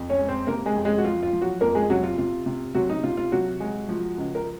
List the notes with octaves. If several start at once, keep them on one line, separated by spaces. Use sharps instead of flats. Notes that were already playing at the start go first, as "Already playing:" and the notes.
Already playing: F2
C#4 C#5
G#3
C4 C5
C3 A#3 A#4
G#3 G#4
F2
G#3 G#4
F#4
F3 F4
F4
F3
F#3 F#4
F2 A#3 A#4
G#3 G#4
C3 F#3 F#4
F4
C3 F4
C3
C3 F#3 F#4
D#4
C3 F4
F4
C3 F#3 F#4
G#3
F3
C#2
A#4